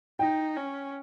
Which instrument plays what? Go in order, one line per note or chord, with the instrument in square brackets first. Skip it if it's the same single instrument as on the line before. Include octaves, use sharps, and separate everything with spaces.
[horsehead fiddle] D#4 [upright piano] G5
[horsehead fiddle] C#4